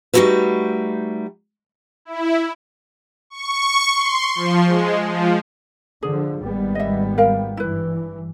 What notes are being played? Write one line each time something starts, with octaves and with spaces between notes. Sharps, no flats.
G3 A3 D#4 F#4 A4 B4
E4
C#6
C6
F3
G#3
F3
D3 F3 G#4
G#1 G3 B3
D#5 E5
A#4 F5 G5
G2 E3 E4 B4